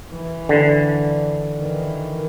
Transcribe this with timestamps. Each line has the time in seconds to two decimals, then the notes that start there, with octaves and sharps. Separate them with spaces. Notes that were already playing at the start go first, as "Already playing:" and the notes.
0.12 E3
0.49 D3
1.57 D#3 E3